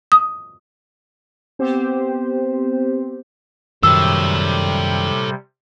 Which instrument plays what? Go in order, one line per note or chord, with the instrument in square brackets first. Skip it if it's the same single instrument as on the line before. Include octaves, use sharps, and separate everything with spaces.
[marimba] D#6
[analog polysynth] B3 C4 G4 C5
[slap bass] F#2 D#3 [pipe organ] C3 G3 [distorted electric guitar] A4 C#5 [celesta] E6